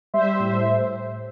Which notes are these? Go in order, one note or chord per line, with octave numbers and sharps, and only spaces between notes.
G3 C5 E5
A2